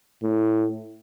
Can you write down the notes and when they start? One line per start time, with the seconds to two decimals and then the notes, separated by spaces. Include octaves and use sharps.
0.23 A2